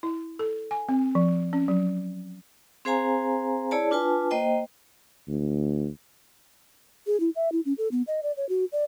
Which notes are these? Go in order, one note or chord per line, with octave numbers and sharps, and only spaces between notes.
E4
A4
G#5
C4
F3
C#4
F#3
C4 G#4 C5 F5 G#5 A#5
E4 G#4 C#5 D5 A5
D4 F4 B4 G#5 A5
A#3 C5 D#5 G5
D2
G#4
E4
E5
E4
C#4
A4
B3
D#5
D5
C#5
F#4
D5